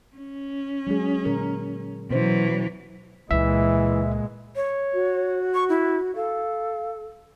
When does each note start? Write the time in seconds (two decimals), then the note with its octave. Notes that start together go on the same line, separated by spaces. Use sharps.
0.16 C#4
0.87 F#3 G#3 G#4
1.25 A#2 D3 A#4
2.11 B2 E3 F#3 C#4 C5
3.31 C#2 A#2 E3 G#3 E5
4.56 C#5
4.93 F#4
5.54 C#6
5.69 E4
6.15 A4 F5